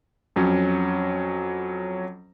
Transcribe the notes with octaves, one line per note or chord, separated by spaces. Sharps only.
F2 F#3 C#4